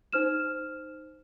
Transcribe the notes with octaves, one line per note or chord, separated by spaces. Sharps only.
D#4 C5 F6 E7